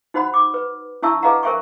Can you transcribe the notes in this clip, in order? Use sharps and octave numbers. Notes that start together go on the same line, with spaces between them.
D#4 F#4 C5 F#5 B5
D6
B4
D4 E4 E5 A5 C#6 E6
G#4 B4 D#5 F5 F#5 A#5
A#4 C5 E5 G#5 C#6